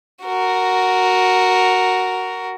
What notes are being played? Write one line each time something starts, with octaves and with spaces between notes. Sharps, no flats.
F#4 A#4